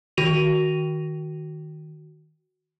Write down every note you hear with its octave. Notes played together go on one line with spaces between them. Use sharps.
D#3 F#4 D#7 F7